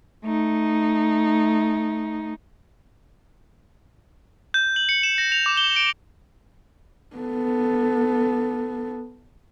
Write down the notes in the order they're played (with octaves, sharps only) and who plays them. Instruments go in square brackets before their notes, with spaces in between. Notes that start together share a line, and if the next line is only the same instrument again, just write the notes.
[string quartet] A3 D#4
[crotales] G6
F#7
C#7
E7
A#6
F7
D6
G7
D7
[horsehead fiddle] B3 A4